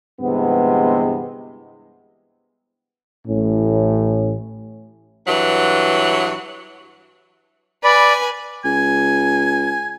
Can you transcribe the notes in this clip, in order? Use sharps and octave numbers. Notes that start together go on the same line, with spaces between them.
G1 G2 C3 E3 G#3 B3
A1 A2 C#4
G2 E3 F#3
B4 D5 G#5 B5
C#2 G#5